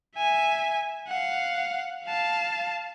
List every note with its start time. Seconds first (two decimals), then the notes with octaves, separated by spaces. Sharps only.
0.17 E5 G#5
1.08 F5 F#5
2.05 F5 A5